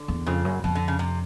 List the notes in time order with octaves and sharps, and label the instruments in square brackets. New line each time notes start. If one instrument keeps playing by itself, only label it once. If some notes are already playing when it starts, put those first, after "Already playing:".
Already playing: [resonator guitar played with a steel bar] D3
[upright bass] E2
[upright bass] F2 [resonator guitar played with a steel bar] C#3
[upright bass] F#2
[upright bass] F2 [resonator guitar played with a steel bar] B2
[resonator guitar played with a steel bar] D3
C#3
C3